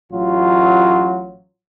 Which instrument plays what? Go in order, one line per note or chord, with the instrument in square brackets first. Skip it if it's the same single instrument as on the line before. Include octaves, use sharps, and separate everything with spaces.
[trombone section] A1 F#3 F4